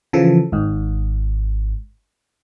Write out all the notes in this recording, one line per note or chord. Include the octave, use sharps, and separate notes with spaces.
C#3 E3 F3 A4
G#1 G#2